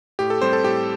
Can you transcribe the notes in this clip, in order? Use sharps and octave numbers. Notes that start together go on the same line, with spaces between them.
A2 G4
A4
G3 C4 C5
A4
A2 G4